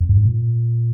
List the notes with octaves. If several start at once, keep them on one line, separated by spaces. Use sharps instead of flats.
F2
G2
G#2
A#2